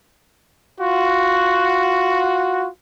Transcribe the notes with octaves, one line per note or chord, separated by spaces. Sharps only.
F4 F#4